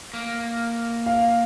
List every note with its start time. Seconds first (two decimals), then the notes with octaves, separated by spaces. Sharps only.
0.14 A#3
1.06 F5